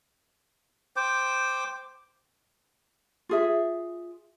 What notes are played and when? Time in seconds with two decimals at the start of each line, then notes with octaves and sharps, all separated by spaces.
0.96 C5 G5 D6
3.29 F4 G#4 E5